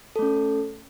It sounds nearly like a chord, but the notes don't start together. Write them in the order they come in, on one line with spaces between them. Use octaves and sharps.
A4 A3 C#4